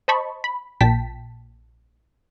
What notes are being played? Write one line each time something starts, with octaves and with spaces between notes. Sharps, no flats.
C5 D#5 A5 B5 C#6
B5
A#1 A#2 G5 A5 B6